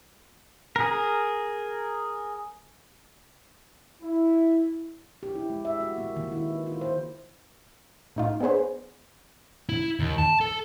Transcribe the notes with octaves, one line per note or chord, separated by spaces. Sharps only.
G#4 A#4
E4
G4
E4
G#3
E5
F#4
A#3
D#3
E4
B4
F4
C5
A2 D#4 F4
B3 D4 G#4 B4 C5
E4
D#2
A5
A4